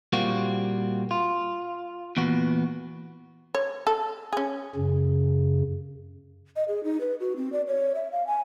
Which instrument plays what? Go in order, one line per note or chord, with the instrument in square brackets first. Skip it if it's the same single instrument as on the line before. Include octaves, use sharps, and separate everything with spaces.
[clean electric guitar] A#2 G3 A#3 C4 F4 F#4
F4
E2 A#2 B3 F#4
[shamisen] C#5
A4
C#4 G#4
[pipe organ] F#2 C#3
[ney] D#5
G#4
D#4
B4
F#4
C4
D5
C#5
E5
F5
G#5